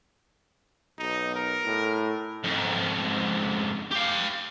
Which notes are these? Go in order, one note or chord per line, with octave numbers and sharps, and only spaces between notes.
B1 D#4
A#4
A2
F2 G#2
G4 F5